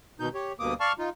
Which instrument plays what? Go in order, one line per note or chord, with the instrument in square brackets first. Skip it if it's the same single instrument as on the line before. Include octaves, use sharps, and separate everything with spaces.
[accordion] D#2 B2 D#4 G6
G4 C#5
D2 G2 B2 A#3 D6 D#6
D5 F5 A5 C#6 F6
D#4 F4